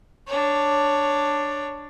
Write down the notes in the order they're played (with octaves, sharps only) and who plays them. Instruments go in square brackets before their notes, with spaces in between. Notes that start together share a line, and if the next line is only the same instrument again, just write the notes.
[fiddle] D4 C#5